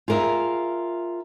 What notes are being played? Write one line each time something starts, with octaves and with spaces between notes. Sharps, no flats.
F4 G#4 A#4 D#5 E5